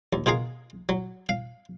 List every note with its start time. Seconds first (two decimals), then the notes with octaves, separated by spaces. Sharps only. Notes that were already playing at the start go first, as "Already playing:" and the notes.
0.13 D#2
0.26 B2 F4 G#4 A#4 F5
0.89 F#3
1.29 F5